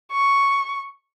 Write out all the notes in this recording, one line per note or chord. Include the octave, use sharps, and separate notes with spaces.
C#6